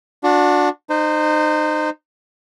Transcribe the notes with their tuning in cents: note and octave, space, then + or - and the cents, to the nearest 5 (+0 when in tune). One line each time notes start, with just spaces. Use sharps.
D4 +0 F#4 -35
D#4 -25 C5 -10